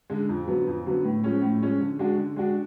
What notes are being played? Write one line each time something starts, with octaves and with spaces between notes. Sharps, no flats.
D3 G#3
F2
D3 F#3 B3
F2
D3 F#3 B3
A2
F3 G#3 C#4
A2
F3 G#3 C#4
D3
G#3 D4 F#4
D3
G#3 D4 F#4